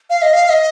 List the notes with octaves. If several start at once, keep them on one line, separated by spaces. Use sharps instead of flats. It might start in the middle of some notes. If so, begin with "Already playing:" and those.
F5
D#5
F5
F5
D#5